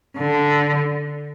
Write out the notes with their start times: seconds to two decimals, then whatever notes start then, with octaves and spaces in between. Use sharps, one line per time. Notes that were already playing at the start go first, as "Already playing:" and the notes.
0.18 D3